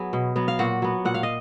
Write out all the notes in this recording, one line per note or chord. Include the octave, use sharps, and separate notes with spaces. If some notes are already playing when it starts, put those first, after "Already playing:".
Already playing: F#3 B3 G#4
B2
F#3 B3
F5
A#2 F#4 F#5
F#3 B3
A#2 F#5
F5
D#5